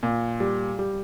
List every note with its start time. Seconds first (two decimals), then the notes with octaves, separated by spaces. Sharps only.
0.03 A#2
0.40 G3
0.79 G3